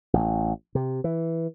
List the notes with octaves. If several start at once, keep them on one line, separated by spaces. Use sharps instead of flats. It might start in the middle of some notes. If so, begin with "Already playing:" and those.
A1
C3
E3